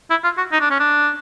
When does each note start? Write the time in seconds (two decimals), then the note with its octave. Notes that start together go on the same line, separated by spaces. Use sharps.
0.10 E4
0.24 F4
0.37 F#4
0.52 D#4
0.61 D4
0.70 C#4
0.80 D4